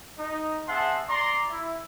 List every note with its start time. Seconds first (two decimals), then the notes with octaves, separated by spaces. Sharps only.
0.19 D#4
0.68 C4 G#4 E5 F#5 A5 C6
1.10 D5 A#5 C6
1.50 E4